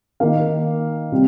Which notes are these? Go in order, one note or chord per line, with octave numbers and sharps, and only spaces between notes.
D#3 A#3 F5
C3 G3 C4